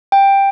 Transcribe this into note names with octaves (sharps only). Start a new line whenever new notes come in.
G5